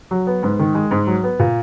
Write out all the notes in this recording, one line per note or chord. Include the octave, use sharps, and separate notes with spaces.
F#3
B3
G#2
D#3
G#3
G#2
F#3
B3
A#2